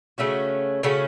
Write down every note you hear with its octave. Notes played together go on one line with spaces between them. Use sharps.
C#3 A3 C#4 F#4
C#3 A3 C#4 F#4